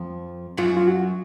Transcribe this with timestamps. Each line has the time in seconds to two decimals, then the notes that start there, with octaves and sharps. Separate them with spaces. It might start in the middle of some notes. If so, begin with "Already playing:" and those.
Already playing: F2 F3
0.57 F#2 F#3 F4
0.77 F4
0.87 F#4